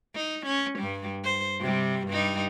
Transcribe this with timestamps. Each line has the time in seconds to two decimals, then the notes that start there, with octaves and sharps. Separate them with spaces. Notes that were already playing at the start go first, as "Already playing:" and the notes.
0.15 D#4
0.46 C#4
0.79 G2 G3
1.24 C5
1.60 C3 G3
2.08 G2 G3 D#4